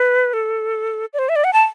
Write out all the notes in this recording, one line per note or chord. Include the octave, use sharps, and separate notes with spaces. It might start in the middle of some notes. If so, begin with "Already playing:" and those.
Already playing: B4
A4
D5
C5
E5
D5
F#5
A5